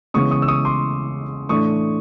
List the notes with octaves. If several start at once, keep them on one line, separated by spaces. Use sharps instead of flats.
C#3 E3 G#3 B3 C#6 D#6
C#6 D#6
E6
C#6 D#6
C6 D6
A2 E3 A3 D4 C#6 D#6